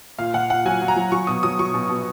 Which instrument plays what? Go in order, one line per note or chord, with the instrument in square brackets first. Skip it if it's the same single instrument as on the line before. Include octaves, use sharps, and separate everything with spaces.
[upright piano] A#2 F5
A#2 F#5
A#2 F#5
F#3 G#5
F#3
A#5
F#3
F#3 C#6
B2 D#6
F#3 D#6
F#3 C#6
B2
B2